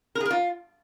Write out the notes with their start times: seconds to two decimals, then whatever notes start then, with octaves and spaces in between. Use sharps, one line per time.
0.15 A#4
0.20 G#4
0.25 A#4
0.31 F4